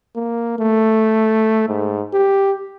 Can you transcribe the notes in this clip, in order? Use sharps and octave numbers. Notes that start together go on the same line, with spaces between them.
A#3
A3
G#2
G4